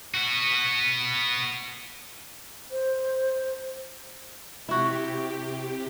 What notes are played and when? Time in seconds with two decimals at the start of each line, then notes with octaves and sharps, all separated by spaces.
0.14 B3 F#4
2.71 C5
4.69 C3 E4 F#4 G4